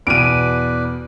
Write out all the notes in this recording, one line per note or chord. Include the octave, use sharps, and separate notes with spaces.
E2 B2 B4 D5 D7 D#7